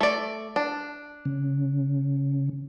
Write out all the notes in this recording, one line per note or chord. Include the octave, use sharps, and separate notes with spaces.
A3 D5
D4
C#3